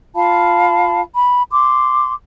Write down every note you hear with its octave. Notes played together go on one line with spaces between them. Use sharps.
F4 F5 A5 B5
B5
C6 D6